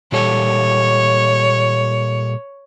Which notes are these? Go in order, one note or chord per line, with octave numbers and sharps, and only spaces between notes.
A#2 G3 A4 C#5